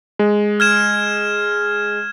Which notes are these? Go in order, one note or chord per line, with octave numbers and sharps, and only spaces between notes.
G#3
F6 G#6 E7